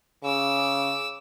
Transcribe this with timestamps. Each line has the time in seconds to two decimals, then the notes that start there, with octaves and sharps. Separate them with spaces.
0.24 C#3 D6 E6